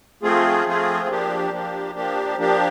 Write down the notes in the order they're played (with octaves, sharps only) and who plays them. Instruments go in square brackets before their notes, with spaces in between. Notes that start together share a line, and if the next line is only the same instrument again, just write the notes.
[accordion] F3 A3 C4 F4 G#4
F3 A3 C4 F4 G#4
F3 A#3 D4 G4
F3 A#3 D4 G4
F3 A#3 D4 G4
F3 A#3 D4 G4